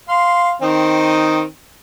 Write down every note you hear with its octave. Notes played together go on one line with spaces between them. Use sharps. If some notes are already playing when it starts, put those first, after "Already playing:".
F5 C6
D#3 C4 D#4